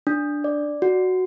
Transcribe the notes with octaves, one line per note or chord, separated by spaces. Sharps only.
D4
D5
F#4